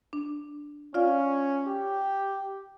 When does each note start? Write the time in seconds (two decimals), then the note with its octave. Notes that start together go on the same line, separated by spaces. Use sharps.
0.13 D4
0.94 C#4 F4 D5 F5
1.67 G4